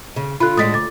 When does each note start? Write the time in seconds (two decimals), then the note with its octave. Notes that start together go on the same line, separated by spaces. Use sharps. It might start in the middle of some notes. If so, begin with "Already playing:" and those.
0.16 C#3
0.40 D3 F4 B5 F#6
0.57 A2 G#3 D4 D#6 A6 B6
0.74 D2 D6 A6